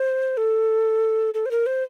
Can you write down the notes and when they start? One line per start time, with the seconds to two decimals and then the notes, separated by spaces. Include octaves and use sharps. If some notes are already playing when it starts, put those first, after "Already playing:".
Already playing: C5
0.37 A4
1.34 A4
1.46 C5
1.51 A#4
1.66 C5